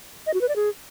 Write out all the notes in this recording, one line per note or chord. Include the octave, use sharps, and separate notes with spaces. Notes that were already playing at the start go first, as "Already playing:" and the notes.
D#5
F#4
B4
D5
G#4